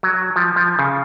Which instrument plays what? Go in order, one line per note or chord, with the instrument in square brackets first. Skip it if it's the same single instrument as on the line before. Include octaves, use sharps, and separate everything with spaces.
[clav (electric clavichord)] F#3
F3
F3
C#3